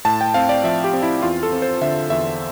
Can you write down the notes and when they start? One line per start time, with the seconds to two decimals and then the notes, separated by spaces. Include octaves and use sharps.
0.05 A2 A5
0.21 G5
0.34 C4 F5
0.49 D5
0.64 F3 E5
0.84 G4
0.93 C4
1.03 E4
1.23 E2 F4
1.43 A4
1.52 C4
1.62 C5
1.82 D3 E5
2.10 E2 E5